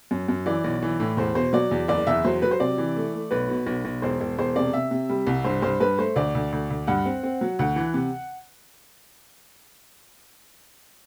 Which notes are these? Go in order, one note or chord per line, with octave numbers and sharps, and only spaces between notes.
F#2
F#2
E3 D5
B1
E3
A2
E2 C5
B2 C5
F#3 D5
E2
F#1 D5
E2 E5
F#3 C5
F#3 B4
C5
C3 D5
E3
A3
A3
B1 B4
B2
B1
B1
E1 C5
E1
E1 C5
C3 D5
C3 E5
C3
G3
C2
G2 C5
G2 C5
G2 B4
A3 C5
D2 D5
D2
D2
D2
G2 F#5
C4
C4
F#3
D2 F#5
E3
C3